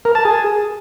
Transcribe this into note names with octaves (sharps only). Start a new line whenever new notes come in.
A#4
A5
G#4